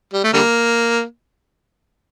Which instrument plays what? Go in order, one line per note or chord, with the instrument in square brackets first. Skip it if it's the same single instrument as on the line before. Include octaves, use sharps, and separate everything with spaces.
[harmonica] G3
A3
D3 G3 A#3